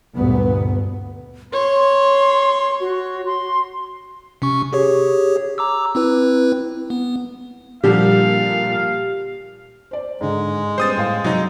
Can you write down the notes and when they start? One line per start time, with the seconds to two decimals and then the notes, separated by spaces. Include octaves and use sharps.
0.16 D2 G2 A#2 B3
1.53 C#5 C6
2.81 F#4
3.26 C6
4.42 C3 C#4 C#6
4.73 G4 G#4 C#5
5.58 A#5 D6 E6
5.95 C4 E4 B4
6.90 B3
7.84 A#2 D3 F3 G3 G4 F5
9.91 C5 D5
10.21 G#2 D3 G#3
10.78 G3 B3 C#4 C5 D#6 A6
10.97 A2 F5
11.24 C3 F#3 D#4